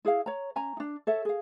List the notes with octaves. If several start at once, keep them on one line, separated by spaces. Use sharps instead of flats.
E4 G#4 C#5 F5
C#5 A#5
C#4 G#5 A#5
D4 D#4
A4 C#5 E5
G#4 F5